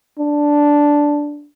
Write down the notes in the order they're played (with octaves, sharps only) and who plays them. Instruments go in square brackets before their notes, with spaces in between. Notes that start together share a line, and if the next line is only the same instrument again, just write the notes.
[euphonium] D4